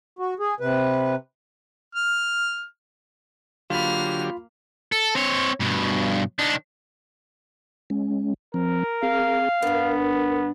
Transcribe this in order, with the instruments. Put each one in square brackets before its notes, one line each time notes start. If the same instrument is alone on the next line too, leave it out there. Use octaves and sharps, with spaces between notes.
[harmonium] F#4
G#4
C3 B4
[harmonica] F6
[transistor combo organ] D3 F#3 G4 [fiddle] A#3 F6 [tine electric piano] F4 B5
[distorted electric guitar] A4
C4 C#5
G2 B2
D#3 D4
[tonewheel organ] G#3 C#4
[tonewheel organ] F3 C4 [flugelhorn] A#4
[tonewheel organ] C4 G#4 [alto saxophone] F5
[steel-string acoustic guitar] G2 D4 [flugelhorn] B3 [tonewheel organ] A#4